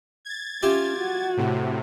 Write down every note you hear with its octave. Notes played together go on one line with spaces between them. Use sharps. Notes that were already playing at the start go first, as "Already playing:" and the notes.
G#6 A6
C#4 F4 G4 E5
F#4
A2 C3